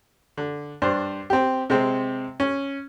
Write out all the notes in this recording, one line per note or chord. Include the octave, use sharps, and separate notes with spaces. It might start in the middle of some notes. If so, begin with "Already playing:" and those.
D3
G2 D4 C5
C4 G4
C3 G#3 C4
C#4